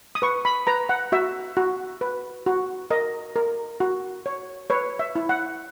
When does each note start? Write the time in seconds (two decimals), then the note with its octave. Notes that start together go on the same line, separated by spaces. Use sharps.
0.15 D#6
0.22 B4 C#6
0.45 B5
0.67 B4 A#5
0.89 F#5
1.12 F#4 E5
1.57 F#4
2.01 B4
2.46 F#4
2.91 A#4 D#5
3.36 A#4
3.80 F#4
4.26 C#5
4.70 B4 C#5
4.99 E5
5.15 E4
5.29 F#5